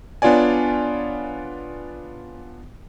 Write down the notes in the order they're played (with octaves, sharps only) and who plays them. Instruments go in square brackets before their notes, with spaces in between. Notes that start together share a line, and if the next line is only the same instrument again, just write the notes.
[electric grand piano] B3 D4 F4 C#5 D5 G#5